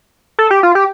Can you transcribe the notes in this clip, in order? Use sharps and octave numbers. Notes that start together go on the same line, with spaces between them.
A4
G4
F4
G4